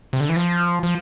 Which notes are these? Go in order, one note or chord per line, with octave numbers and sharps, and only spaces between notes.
C3
D3
E3
F3
F3